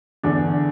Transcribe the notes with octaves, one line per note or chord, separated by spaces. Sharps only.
E2 D3 D4